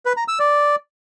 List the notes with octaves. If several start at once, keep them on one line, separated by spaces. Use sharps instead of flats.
B4
A#5
E6
D5